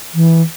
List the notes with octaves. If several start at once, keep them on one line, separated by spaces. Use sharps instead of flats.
E3